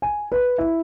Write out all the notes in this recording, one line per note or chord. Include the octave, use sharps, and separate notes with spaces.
G#5
B4
E4